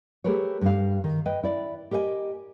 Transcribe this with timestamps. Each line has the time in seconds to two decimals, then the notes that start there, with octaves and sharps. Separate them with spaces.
0.24 A3 G4 G#4 A#4 B4 C#5
0.61 G2 G3 F5
1.04 D#3
1.25 B4 D#5 G5
1.43 E4 D5
1.91 G4 A#4 D#5 F5 G#5